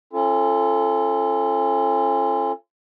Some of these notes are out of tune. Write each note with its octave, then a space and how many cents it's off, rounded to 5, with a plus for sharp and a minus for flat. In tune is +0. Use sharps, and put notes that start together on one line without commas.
C#4 -35 F4 -30 A4 +0